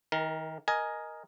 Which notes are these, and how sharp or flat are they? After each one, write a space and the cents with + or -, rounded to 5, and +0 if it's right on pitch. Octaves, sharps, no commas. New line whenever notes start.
D#3 +35 A#4 +5
A#4 +5 D#5 +0 G#5 +10